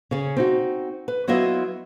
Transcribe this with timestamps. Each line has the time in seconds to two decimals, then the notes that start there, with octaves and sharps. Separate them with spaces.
0.11 C#3 C#4
0.36 C4 D#4 F#4
1.08 B4
1.28 F#3 B3 E4 F4 D#5 E5